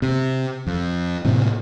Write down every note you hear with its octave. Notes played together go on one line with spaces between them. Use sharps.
C3
F2
A2 C3 F#3